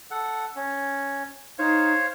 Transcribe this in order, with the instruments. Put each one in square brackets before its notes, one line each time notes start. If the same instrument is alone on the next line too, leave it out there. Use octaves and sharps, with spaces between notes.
[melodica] A4 F#5
C#4
[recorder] D#4 [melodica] C5 C#5 F5